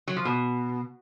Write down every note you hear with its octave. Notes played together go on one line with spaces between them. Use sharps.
F#3
F3
B2